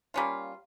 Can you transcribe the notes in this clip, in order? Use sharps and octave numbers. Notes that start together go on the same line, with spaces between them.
G3 A#3 C#4 F4